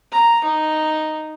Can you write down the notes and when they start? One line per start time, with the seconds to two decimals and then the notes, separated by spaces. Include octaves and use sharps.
0.12 A#5
0.44 D#4